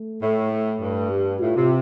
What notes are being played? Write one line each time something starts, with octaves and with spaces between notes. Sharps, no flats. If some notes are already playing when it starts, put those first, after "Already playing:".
Already playing: A3
A2
A3
G2
G4
A2 F4
C3